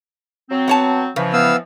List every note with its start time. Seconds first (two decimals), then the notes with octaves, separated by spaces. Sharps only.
0.50 F#3 C4
0.68 B3 C#5 A5
1.16 C#3 E3 F3
1.33 B3 F5 E6